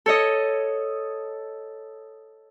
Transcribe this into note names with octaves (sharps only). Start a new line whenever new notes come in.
A4 C#5 D#5